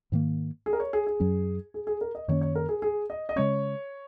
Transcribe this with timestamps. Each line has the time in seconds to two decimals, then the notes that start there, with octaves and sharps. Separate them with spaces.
0.12 G#2 D#3 A#3
0.66 G#4
0.73 A#4
0.80 C#5
0.93 G#4
1.07 G#4
1.20 F#2 F#3 C#4
1.74 G#4
1.87 G#4
2.01 A#4
2.15 D#5
2.28 F#2 D#3 A#3 C#4 C#5
2.41 C#5
2.55 A#4
2.69 G#4
2.82 G#4
3.10 D#5
3.29 D#5
3.36 C#3 G#3 C#4 C#5